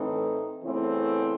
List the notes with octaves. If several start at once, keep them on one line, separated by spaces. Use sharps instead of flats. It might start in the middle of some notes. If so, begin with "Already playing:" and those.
Already playing: A2 E3 A3 C4 D#4
E2 C#3 E3 A3 C4